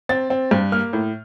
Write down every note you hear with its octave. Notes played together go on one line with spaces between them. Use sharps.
C4 A6
C4
G2
A#3 F6
A2